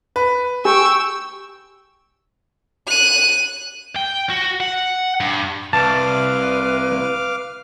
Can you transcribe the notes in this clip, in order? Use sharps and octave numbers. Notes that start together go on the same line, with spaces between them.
B4
G4 G5 G#5 C#6 E6
F#6 D#7
G5
F#4
F#5
G2
C2 B4 F5 A5 D6 F6